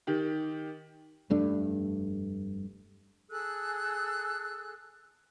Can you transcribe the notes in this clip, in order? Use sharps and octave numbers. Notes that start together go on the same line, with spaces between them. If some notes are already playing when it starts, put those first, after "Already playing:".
D#3 G4
F1 G2 A3 D4
G#4 A4 E6 F#6